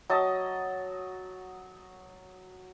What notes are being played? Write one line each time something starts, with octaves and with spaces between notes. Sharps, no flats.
F#3 D#5 A5 D#6